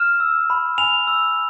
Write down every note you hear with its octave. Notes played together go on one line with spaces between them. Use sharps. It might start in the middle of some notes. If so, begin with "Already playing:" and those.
Already playing: F6 E7
E6
B5
G#5 F7
E6